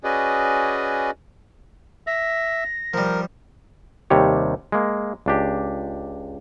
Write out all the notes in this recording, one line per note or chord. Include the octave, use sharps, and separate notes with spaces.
C#4 F#4 G#4 B4 D5 D#5
E5 A#6
F3 G3 A#4
D#2 C3 G3 C#5
G#3 A#3
C#2 D4 G4